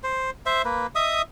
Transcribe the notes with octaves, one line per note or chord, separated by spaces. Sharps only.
C5
C5 E5
A#3 B4
D#5 E5 D#6